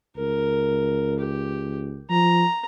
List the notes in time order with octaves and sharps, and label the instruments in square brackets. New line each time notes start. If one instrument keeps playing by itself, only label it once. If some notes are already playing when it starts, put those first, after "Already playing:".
[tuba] C#2 [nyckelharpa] A#4
[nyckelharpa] G4
[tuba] F3 [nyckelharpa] A#5